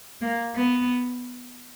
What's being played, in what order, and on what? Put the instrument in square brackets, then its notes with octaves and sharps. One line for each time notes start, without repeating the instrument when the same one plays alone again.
[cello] A#3
B3